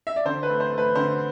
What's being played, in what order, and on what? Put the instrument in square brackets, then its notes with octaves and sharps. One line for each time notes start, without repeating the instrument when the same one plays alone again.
[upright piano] E5
D5
D3 C5
B4
A3
C5
A3
B4
D3 C5